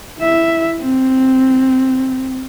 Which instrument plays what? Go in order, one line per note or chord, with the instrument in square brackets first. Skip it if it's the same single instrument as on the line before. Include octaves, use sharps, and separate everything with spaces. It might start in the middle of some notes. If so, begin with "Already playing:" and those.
[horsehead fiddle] E4 E5
C4